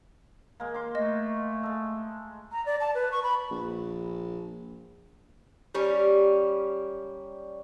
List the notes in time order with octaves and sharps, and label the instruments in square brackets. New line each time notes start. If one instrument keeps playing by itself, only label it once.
[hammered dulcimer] G#3 A#3
C6 D6
[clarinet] A3 [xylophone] D#5
[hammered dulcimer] G#3 A4
[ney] A#5
D5
A5
B4
C#6
B5
[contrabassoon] A#1
[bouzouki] G3 A#3 C#4